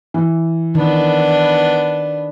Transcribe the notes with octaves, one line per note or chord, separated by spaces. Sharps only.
E3
D#3 B3 D4